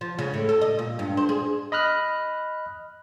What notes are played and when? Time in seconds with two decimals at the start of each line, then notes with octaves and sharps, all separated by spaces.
0.01 F3
0.19 C#3
0.34 A2
0.49 A4
0.61 D#5
0.79 A#2
0.99 G2
1.17 C5
1.29 G#4
1.72 D#5 B5 F6 F#6